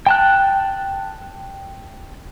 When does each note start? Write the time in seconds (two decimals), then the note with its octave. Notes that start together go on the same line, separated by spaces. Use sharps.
0.07 G5 A5 F#6